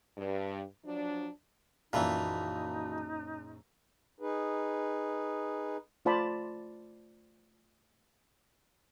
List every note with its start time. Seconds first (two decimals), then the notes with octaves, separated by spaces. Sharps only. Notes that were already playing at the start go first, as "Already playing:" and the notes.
0.18 G2
0.85 F3 F#3 D4
1.93 A#1 F#2 A#2 E3 D#4 F#4 A5 B5
4.20 D#4 G#4 B4
6.05 A3 F4 C5 D5 A5 B5